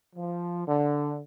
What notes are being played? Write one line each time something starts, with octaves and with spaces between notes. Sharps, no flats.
F3
D3